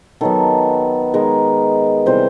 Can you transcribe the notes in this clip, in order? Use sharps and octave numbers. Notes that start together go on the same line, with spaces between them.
D#3 F#3 B3 A4
D#3 G#3 B3 A#4
C3 E3 G3 C5